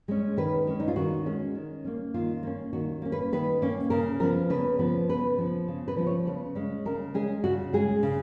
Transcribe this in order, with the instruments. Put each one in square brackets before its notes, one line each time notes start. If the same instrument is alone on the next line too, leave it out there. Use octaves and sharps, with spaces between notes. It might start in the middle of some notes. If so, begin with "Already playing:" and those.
[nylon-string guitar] G#3 C#4
D#3 B4
G#3 C#4
D#4
F4
D#3 F#4
G#3 C#4
D#3
A#3 C#4
D#3 F4
A#3 C#4
D#3 F#4
A#3 C#4
B4
D#3 B4
A#3 C#4
C#3 A#4
F3 B3 A#4
C#3 B4
F3 B3
C#3 B4
F3 B3
C#3
B4
F3 B3
C#5
C#3 B4
G#3 C#4
C#3 A#4
G#3 C#4 G#4
C#3 F#4
G#3 C#4 G#4
C#3